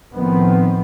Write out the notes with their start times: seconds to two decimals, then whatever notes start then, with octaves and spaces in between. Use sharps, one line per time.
0.13 A2 D#3 F3 B3 C4